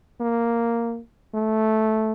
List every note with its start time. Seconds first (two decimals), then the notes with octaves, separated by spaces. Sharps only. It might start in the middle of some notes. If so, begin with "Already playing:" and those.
0.20 A#3
1.34 A3